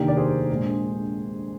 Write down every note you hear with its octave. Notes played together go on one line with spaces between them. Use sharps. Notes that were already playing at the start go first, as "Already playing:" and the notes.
Already playing: F1 D#2 D#3 A#3 D4 G4 A#4
D5
G#4 C5
A#1 A#2 G#3 D4